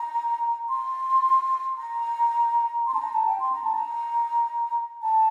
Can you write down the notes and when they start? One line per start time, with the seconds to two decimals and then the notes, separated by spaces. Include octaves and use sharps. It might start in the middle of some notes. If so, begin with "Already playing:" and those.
Already playing: A#5
0.69 C6
1.78 A#5
2.87 C6
2.94 A5
2.99 A#5
3.13 A5
3.27 G5
3.40 C6
3.52 A#5
3.64 A5
3.75 A#5
5.02 A5